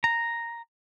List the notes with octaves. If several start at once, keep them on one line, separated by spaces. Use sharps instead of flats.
A#5